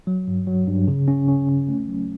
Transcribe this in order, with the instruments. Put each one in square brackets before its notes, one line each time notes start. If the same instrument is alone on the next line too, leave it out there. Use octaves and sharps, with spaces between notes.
[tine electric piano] F#3
G2
F#3
G2
C#3
C#4
C#4
C#4
A3
F#3